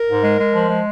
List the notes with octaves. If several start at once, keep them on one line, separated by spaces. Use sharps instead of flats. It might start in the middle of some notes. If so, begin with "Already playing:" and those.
Already playing: A#4
G#2
G#3
G#3
F3
G#3